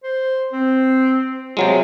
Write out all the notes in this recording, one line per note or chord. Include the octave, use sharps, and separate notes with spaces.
C5
C4
C3 F#3 G#3 F4